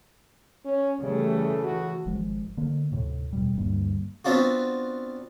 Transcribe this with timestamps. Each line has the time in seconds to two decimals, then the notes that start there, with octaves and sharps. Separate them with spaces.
0.65 C#4
1.02 C#3 E3 G3 A3
1.64 F#4
2.06 G#1 F3 G#3
2.57 D3 A#3
2.91 D2 A2 C3
3.33 E2 B2 G3
3.57 D2 G2 G3 A#3
4.25 B3 C4 D4 F4 F#4